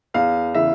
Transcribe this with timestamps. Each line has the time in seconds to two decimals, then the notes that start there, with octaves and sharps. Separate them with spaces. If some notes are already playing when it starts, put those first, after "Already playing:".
0.14 E2 F5
0.54 C#3 E3 E5